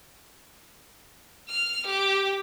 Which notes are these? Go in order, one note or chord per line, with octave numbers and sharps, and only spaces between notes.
F6
G4